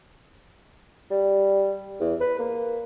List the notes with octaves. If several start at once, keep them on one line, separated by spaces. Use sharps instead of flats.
G3
E2
B4
A#3